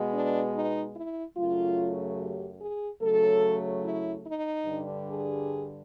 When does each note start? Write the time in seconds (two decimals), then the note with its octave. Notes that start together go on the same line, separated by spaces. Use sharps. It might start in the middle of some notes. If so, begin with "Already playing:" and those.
Already playing: B2 G#3 B3
0.12 D4
0.54 D#4
0.95 E4
1.36 F#2 C#3 F#3 A3 F4
2.19 G4
2.60 G#4
3.01 C#3 F#3 A3 A4
3.84 E4
4.25 D#4
4.66 G2 D3 G3
5.07 G#4